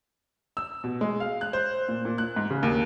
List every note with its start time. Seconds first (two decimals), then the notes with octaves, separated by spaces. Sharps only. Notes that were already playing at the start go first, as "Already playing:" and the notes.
0.57 E6
0.84 B2
1.01 G#3
1.20 F5
1.41 F#6
1.53 C5
1.88 A#2
2.05 A#2
2.18 F#6
2.36 G#2
2.50 C#3
2.63 D#2